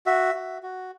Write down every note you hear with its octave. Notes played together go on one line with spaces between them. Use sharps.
F#4 E5
F#4
F#4